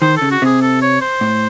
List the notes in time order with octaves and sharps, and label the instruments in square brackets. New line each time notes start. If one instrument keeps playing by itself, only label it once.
[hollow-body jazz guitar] D#3 [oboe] C5
[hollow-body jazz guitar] C#3 [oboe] A4
[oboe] F#4
[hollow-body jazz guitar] C3 [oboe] G#4
[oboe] A4
C#5
C5
[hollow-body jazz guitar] A2